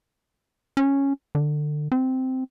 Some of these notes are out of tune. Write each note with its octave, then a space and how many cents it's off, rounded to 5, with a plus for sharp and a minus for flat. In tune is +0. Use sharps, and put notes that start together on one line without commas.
C#4 -5
D3 +25
C4 -10